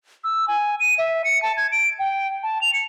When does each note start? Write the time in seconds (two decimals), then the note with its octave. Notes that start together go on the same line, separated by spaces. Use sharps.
0.24 E6
0.48 G#5
0.80 D#7
0.98 E5
1.24 C#7
1.42 A5
1.57 G#6
1.72 D7
1.99 G5
2.43 A5
2.62 F7
2.73 C#7